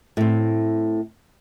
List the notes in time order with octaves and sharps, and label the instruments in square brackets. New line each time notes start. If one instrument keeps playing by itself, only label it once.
[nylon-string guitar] A2 C4